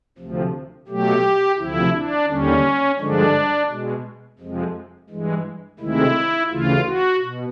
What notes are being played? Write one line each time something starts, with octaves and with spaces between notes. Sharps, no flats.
D2 C3 F3
B2 F#3 A3 G4
D2 C3 F3 E4
D4
D#2 D3 G3 C#4
G2 D3 F3 G#3 D4
B2 G#3
F2 C3 F3 G#3
G2 E3 G#3
D2 C3 D#3 G#3 E4
D2 C#3 E3 F4
F#4
B2